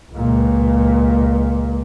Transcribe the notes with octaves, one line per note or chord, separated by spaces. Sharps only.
C#2 A#2